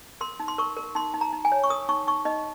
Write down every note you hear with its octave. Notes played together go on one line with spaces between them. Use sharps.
A#4 C6
D#4
C6
A#4 C#6
A#4
D#4 C6
D#4
A#5
D#4
G#5
C#5
C#6
A#4 D#6
D#4 C#6
D#4 C#6
D#4 D#5